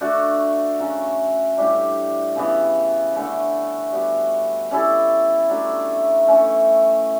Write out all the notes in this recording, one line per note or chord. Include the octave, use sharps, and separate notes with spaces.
A3 D4 F#4
C#3 F#3 C#4
A2 G3 D4 G4
C#3 E3 B3
D3 A3 C#4
G3 B3 F#4
G3 C#4 E4 A4
F#3 A3 D4
E3 A3 C#4